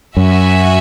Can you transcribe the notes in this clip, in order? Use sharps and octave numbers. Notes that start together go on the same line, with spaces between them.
F#2 F#4 E5 G#5